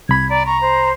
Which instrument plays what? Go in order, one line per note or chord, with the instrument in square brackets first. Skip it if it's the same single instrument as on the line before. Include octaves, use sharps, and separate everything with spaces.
[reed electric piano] C2 B5 [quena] G#6
[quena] D5 [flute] A#5
[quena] A#5 [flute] C#6
[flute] C5